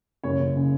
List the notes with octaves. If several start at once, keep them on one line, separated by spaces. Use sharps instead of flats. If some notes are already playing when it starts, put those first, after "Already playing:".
F#1 C#5
F#1
C#3